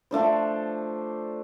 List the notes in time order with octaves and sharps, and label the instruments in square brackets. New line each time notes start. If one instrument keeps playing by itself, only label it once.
[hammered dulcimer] F3 A3 D4 C5